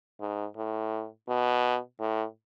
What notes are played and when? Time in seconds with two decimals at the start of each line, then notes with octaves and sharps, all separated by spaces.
0.21 G#2
0.57 A2
1.28 B2
2.00 A2